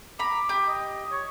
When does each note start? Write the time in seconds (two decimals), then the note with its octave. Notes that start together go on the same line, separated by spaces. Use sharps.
0.19 A#5 B5 D6
0.49 G4
0.67 D#5
1.12 C#5